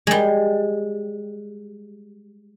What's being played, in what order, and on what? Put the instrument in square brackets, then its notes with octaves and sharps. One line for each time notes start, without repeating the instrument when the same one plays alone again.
[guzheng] G3 G#3